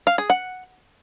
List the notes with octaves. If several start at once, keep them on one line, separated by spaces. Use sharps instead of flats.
F5
G#4
F#5